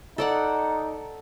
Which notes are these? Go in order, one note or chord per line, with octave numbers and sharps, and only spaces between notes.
D#4 A4 D5 F#5